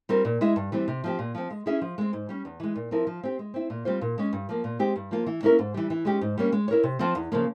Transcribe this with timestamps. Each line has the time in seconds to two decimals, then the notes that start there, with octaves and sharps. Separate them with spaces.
0.09 G3 C4 F4 A#4
0.25 A#2
0.41 G#3 E4 G#4 E5
0.56 G2
0.72 E3 G3 C4
0.88 C3
1.04 F3 C4 G4
1.19 A#2
1.35 F3 C4
1.51 G#3
1.66 C#4 E4 G#4 E5
1.81 F3
1.98 G#3 C4
2.13 G#2
2.29 G3 C#4
2.45 E2
2.60 E3 G#3
2.75 A#2
2.91 F3 C4 E4 A#4
3.07 F3
3.23 C4 G4
3.39 G#3
3.54 C4 E4
3.70 A#2
3.85 G3 C4 F4 C5
4.01 A#2
4.18 G#3 C#4
4.33 G2
4.49 F3 A#3
4.64 A#2
4.79 G#3 C4 G4
4.96 G2
5.11 F3 A#3 F4
5.26 E3
5.43 A#3 C#4 E4 A#4
5.59 G#2
5.74 E3 G3
5.90 E3
6.05 G#3 C#4 G4
6.21 G#2
6.38 G3 A#3 C#4
6.52 G#3
6.68 E4 A#4 C#5
6.83 C3
6.99 F3 C4 F4
7.15 E2
7.32 C#3 F3 A#3